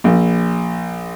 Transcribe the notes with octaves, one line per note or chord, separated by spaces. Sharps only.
A#1